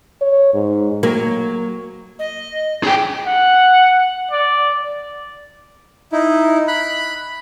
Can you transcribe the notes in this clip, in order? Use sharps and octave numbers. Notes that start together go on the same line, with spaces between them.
C#5
G#2
F#3 A#3
D#5
G#4 G5
F#5
D5
D#4 E4
B5 F#6